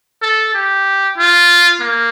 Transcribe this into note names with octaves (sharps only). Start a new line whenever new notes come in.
A4
G4
F4
A#3